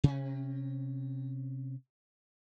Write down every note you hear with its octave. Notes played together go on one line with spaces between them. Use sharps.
C3 C#4